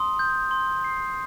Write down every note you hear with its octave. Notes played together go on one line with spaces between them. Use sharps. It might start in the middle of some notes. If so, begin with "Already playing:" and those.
Already playing: C6 D#6
G6
C6
C7